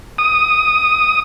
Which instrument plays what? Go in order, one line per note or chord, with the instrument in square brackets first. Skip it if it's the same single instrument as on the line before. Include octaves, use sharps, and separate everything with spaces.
[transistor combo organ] D#6